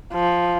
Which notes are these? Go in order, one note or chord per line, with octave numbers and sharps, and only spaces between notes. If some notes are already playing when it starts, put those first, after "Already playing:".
F3